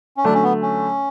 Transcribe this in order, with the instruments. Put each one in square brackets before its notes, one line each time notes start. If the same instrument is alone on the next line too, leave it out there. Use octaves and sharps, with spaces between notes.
[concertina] C#4
[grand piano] D3 F#3 A3 [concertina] D4
[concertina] C#4
B3
C#4